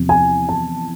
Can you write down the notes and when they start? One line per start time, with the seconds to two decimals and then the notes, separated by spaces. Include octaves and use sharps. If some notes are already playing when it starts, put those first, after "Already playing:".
Already playing: E2 C3 F3
0.09 G#5
0.49 A5